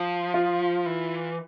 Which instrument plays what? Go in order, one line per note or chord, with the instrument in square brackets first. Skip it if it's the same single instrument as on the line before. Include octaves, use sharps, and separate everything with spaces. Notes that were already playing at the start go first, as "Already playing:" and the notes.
Already playing: [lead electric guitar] F3
[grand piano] F4
[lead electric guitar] E3